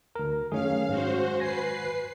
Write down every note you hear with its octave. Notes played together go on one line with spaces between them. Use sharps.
D2 A#4 A#5
F#2 D#3 A3 C#4 G#4 F5
G#2 F#4 C5
B4 G#5 A#6 C7